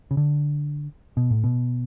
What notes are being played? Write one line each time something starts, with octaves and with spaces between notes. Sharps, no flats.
C#3
D3
B2
A2
B2